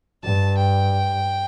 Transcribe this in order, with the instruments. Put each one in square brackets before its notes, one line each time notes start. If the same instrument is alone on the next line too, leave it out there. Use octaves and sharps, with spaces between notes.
[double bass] G2 [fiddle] A5
[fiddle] G5